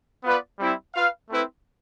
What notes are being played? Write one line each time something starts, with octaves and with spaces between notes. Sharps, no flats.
B3 F4 B4 D5
G3 C4 E4
F4 B4 F5
A3 C4 E4 B4